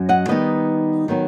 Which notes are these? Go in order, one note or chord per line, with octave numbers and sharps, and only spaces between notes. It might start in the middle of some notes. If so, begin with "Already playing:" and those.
Already playing: F#2 F#3
D#5 F#5
D#3 G3 B3 D#4 B4 D#5
D#3 F#3 B3 D#4